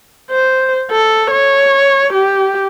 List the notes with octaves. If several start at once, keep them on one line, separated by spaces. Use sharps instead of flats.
C5
A4
C#5
G4